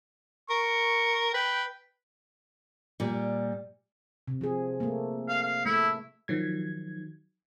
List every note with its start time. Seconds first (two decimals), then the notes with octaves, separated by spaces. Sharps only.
0.50 A#4 C#6
1.34 B4 G5
3.00 A#2 G3
4.28 C3
4.41 F3 G#4
4.80 A3 A#3
5.29 F5
5.43 F5
5.66 A3 E4
6.28 D#3 F3 F#3 G#6